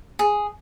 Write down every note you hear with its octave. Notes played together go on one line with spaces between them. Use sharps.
G#4